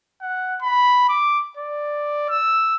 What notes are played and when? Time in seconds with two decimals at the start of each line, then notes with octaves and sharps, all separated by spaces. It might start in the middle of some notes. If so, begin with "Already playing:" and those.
0.22 F#5
0.62 B5
1.09 D6
1.57 D5
2.30 E6